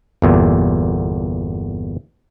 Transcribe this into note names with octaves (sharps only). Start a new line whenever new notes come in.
G1 E2 A#2